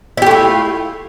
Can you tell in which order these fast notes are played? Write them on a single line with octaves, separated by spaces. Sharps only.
E4 G4 A3 F4